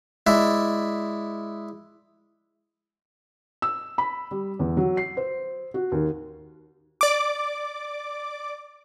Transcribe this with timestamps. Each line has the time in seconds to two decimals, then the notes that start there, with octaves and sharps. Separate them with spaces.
0.27 G#3 E4 D5 E5
3.62 E6
3.98 B5
4.31 G3
4.59 E2
4.77 F#3
4.97 C7
5.17 C5
5.74 F#4
5.92 D#2
7.01 D5 D6